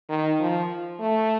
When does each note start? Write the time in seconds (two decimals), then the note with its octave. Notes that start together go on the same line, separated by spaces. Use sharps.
0.09 D#3
0.40 F3
1.00 A3